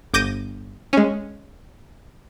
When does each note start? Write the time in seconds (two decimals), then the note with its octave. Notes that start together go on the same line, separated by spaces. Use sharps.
0.14 G1 D6 G6 A#6 D#7
0.93 G#3 C#4